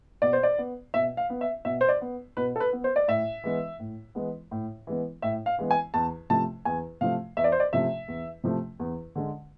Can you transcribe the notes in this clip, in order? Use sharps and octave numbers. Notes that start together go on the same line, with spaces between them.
B2 D5
C5
D5
B3
B2 E5
F5
B3
E5
B2 E5
C5
D5
B3
B2 B4
A4
B4
B3
C5
D5
A2 E5
E3 G#3 B3
A2
E3 G#3 B3
A2
E3 G#3 B3
A2 E5
F5
E3 G#3 B3
G#5
E2 A5
C3 F3 A3 A5
E2 G#5
C3 F3 A3 F5
E2 E5
D5
C5
D5
C3 F3 A3 E5
E2
C3 F3 A3
E2
D3 G#3